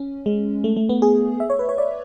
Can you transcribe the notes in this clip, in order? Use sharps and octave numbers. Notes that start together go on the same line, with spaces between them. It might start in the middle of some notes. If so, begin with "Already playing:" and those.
Already playing: C#4
G#3
A3
A3
B3
G#4
E5
C#5
B4
C#5
D5